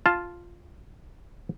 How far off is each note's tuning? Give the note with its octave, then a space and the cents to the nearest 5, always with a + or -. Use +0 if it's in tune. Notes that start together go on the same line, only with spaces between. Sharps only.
F4 +0 A5 +0